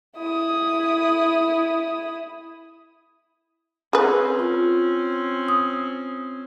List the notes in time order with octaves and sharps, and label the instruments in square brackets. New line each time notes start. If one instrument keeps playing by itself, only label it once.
[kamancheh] E4 D#6
[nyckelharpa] C4 C#4 [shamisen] G#4 B4
[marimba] F4
D#6